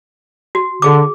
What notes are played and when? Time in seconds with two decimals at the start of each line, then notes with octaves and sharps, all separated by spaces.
0.55 F#4
0.82 D3 G#4 D6